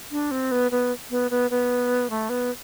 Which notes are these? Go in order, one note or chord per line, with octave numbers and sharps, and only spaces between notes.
D4
C4
B3
B3
B3
B3
B3
A3
B3